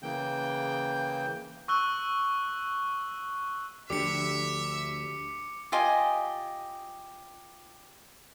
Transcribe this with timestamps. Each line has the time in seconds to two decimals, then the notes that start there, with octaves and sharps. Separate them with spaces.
0.03 C#3 E3 A#3 G5 G6
1.68 C#6 E6 F#6 G7
3.90 D2 D3 F3 D4 G4 E5 D6 C#7
5.72 F4 G4 D#5 G#5